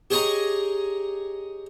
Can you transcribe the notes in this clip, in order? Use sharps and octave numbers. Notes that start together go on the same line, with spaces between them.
G4 G#4 C#5 D#5 G#5 A#5